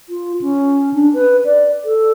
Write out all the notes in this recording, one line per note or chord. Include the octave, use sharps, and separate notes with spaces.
F4
C#4
D4
B4
D5
A4